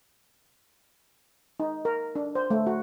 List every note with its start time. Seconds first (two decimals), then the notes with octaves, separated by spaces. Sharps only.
1.60 D#4
1.85 A#4
2.15 D4
2.35 C5
2.50 A3
2.67 F#4